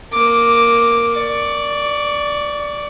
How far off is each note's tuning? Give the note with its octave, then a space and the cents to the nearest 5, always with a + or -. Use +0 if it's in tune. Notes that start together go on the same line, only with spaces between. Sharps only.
A#3 +0 D6 +0
D5 +0 C#6 +35